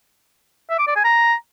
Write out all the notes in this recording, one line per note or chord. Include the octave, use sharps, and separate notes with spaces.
E5
D6
D5
G#5
A#5